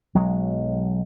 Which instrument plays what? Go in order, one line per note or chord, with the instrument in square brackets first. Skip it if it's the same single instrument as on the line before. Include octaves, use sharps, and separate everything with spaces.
[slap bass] B1 F#3 G#3